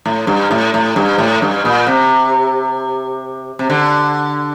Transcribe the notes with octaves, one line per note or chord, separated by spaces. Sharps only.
A2
G2
A2
A2
G2
A2
G2
A#2
C3
C3
D3